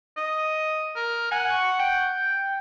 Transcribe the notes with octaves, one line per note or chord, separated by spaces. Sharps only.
D#5
A#4
F#5 G#5
C#6
G5